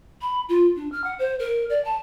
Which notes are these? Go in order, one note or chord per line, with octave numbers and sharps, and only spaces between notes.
B5
F4
D4
F6
F#5
C5
A#4
D5
A5